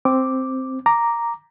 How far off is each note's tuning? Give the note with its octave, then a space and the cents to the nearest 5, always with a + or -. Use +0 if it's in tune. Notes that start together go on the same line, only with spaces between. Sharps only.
C4 +0 D6 +0
A#5 +0 D6 +0